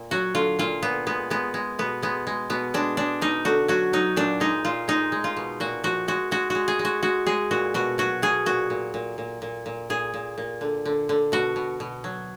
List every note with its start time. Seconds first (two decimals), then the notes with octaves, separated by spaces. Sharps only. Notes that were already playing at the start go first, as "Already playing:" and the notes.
Already playing: A#2
0.11 F#3 F#4
0.35 D3 F4
0.59 A#2 F4
0.82 A#2 B3
1.06 G#3 B3
1.30 G#3 B3
1.54 G#3
1.79 B2 B3
2.02 G#3 B3
2.27 G#3
2.50 B2 B3
2.74 G#3 D4
2.97 G#3 D4
3.21 B2 D#4
3.45 D3 F#4
3.68 F#3 F#4
3.93 F#3 D#4
4.16 A#2 D4
4.40 G#3 D#4
4.65 A#2 F4
4.88 G#3 D#4
5.12 G#3
5.24 F4
5.36 B2
5.60 A#2 F#4
5.84 F3 F#4
6.08 G#3 F#4
6.31 G#3 F#4
6.50 G#3 F#4
6.68 G#4
6.79 G#3
6.85 F#4
7.03 G#3 F#4
7.27 G#3 G#4
7.51 A#2 F#4
7.74 B2 F#4
7.98 F#3 F#4
8.22 B2 G#4
8.46 A#2 F#4
8.70 A#2
8.94 A#2
9.18 A#2
9.42 A#2
9.66 A#2
9.90 A#2 G#4
10.14 A#2
10.38 A#2
10.61 D3
10.85 D3
11.09 D3
11.32 B2 F#4
11.56 B2
11.80 B2
12.04 F#3